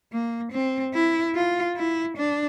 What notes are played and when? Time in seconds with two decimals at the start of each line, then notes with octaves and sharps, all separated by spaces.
0.12 A#3
0.52 C4
0.94 E4
1.35 F4
1.77 E4
2.17 D4